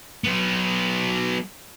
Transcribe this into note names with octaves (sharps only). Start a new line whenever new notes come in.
F#3 B3